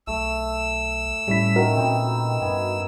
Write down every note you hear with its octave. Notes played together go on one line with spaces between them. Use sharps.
B1 A3 E6
A2 G3 C#4 E4 B6
D#3 F#4 A#4
A#2 C4 D#4 B4
G2 B3 G#5